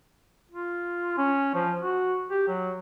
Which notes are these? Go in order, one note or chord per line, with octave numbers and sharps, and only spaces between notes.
F4
C#4
F3
F#4
G4
F#3